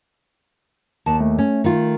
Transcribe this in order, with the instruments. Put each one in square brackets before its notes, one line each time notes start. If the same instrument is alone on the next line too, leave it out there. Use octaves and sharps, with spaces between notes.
[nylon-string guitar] D#2 [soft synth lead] A5
[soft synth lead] A3
[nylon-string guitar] C#4
D#3 F4